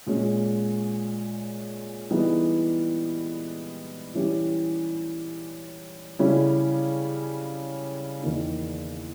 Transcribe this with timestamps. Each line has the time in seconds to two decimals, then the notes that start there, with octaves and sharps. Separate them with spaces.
0.06 A#2 G#3 C#4
2.10 E3 G3 B3 D#4 G#4
4.15 E3 G3 C#4 G4
6.19 C#3 G3 C#4 E4
8.23 E2 D#3 A#3 D#4